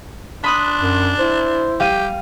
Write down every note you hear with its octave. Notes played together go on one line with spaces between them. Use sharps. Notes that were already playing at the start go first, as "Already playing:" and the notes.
D4 B5 C6 D#6 F#6
F#2
E4 C5
G3 G4 F5 D#7